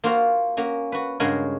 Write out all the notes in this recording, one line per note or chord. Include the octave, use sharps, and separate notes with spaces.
A#3 F4 F#4 C5 F5
A#3 C#4 F#4
F#4 B4
G2 C#3 G#3 F#4 A#4 G#5